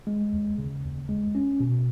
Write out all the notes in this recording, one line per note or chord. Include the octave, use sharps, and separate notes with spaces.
G#3
D#2
C#3
D#2
G#3
C#4
B2